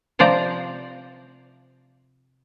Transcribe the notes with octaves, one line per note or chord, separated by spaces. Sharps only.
C3 F3 C5 D5 A#5